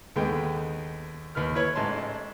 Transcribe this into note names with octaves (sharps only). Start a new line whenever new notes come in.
D#2 D3 G#3 B3 G5
D#2 B4 F6
E4 B4 C#5
A1 G#2 A5 C6